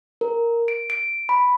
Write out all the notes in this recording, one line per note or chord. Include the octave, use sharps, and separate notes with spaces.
A#4
D7
D7
B5